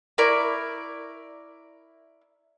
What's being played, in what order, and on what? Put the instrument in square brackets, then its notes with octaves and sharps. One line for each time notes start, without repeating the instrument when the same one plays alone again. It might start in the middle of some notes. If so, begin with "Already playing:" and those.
[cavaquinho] E4 A#4 D5 C#6